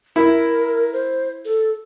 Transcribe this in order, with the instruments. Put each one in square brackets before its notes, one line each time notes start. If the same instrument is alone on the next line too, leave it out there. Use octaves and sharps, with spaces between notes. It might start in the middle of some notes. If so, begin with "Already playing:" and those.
[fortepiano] E4 [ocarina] A#4
[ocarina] C5
A4